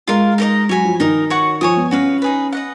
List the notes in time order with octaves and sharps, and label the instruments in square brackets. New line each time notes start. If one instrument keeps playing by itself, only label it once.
[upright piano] G#3 [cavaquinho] F4 A#4 F5
[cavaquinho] D#4 A#4 D#5 A#5
[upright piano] F#3 [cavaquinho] C#5 G#5 B5
[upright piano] F3
[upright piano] D#3 [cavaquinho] D#4 A#4 D#5
[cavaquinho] F#4 C#5 F#5 C#6
[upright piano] F3 [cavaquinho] C#5 G#5 D#6
[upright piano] B3
[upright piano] C#4 [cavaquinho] F#4 B4 F5
[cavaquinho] D#4 G#4 B4
B4 D#5 F#5